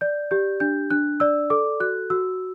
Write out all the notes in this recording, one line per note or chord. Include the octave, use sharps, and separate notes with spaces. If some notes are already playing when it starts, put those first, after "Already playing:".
D5 G6
G4 G6
D4 G6
D4 F#6
D5 E6
A4 D6
F#4 F#6
F#4 E6